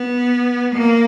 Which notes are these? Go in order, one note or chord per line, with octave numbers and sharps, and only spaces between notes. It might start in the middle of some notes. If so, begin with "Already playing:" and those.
Already playing: B3
A#3